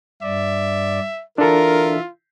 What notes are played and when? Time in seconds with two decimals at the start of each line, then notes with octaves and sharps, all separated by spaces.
0.22 G2 D5 E5
1.38 E3 D4 F4 A4 A#4 E5